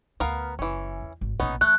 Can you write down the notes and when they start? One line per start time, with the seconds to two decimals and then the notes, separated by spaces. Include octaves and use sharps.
0.20 D2 B3 A#4 F5
0.59 F#1 E3 C#4
1.01 E2
1.21 G#1
1.40 A#1 B2 B3 C#4 D#4
1.61 E3 A3 F#6